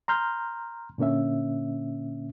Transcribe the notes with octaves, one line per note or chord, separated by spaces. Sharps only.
A#5 C6 F6 G6
A#2 D3 A#3 C#4 E5